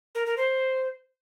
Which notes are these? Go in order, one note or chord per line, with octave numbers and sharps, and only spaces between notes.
A#4
A#4
C5